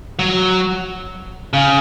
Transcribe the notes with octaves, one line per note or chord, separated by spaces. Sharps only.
F#3
C#3